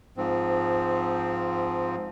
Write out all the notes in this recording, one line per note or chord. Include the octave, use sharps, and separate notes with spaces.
G#2 F3 C4